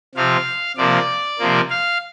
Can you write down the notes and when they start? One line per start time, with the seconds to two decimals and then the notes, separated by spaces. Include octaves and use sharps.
0.15 C3 F3 C4 F5
0.77 C3 F3 A#3 D5
1.39 C3 F3 A#3
1.70 F5